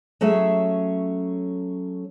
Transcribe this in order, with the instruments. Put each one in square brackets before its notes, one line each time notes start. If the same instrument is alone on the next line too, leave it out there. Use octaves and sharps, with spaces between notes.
[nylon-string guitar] F#3 A3 C#4 G#4 E5